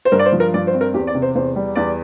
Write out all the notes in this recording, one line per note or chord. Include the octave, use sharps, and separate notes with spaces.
C5
G2 A#4
D5
C5
F3
A#4
G2 D5
C5
C4
A#4
E2 G4
D5
C3
C5
E2 C5
G3
E2 D5